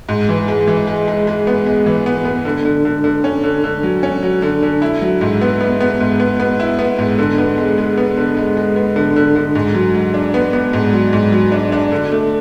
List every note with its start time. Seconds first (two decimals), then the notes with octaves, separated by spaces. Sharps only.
0.09 G#2
0.29 E3
0.48 G#3
0.68 E3
0.87 G#3
1.08 G#3
1.27 G#3
1.47 B3
1.66 G#3
1.86 E3
2.06 B3
2.25 B3
2.45 D3
2.65 D3
2.85 D3
3.04 D3
3.24 C#4
3.44 D3
3.64 D3
3.83 F#3
4.03 C#4
4.23 F#3
4.42 D3
4.62 D3
4.82 E4
5.02 F#3
5.21 G#2
5.41 B3
5.61 B3
5.80 B3
6.00 G#2
6.20 B3
6.40 B3
6.60 E4
6.79 B3
6.99 G#2
7.18 D3
7.38 B3
7.58 G#3
7.78 G#3
7.98 B3
8.17 D3
8.37 G#3
8.57 G#3
8.76 B3
8.96 D3
9.16 D3
9.35 D3
9.55 G#2
9.74 F#3
9.94 F#3
10.14 D4
10.34 B3
10.53 B3
10.73 G#2
10.93 F#3
11.13 G#2
11.32 F#3
11.52 D4
11.72 D4
11.92 D3
12.12 A3